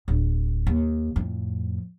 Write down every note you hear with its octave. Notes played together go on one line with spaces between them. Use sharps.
D1
D#2
F2 A2